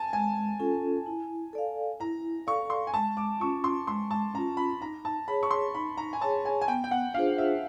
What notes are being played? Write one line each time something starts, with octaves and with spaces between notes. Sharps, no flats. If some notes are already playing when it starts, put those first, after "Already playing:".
Already playing: G#5 A5
G#3 G#5
C#4 F4 A4
E4
A4 D5 F5
E4 A#5
A4 D5 F5 C#6
C6
G#5
G#3 A5
D6
C#4 F4 C#6
C6
G#3 C6
A5
C#4 F4 A#5
B5
D#4 A#5
A5
G#4 C#5 B5
C#6
C6
D#4 B5
A#5
G#5
G#4 C#5 A5
G#5
G#5
B3 G5
G5
F#5
D4 F4 G#4 C5 F5
E5